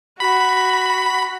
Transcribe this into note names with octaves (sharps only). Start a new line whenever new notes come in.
F#4 B5